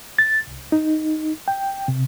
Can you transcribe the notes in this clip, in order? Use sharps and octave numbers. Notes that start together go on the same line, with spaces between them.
A6
C2
D#4
G5
C3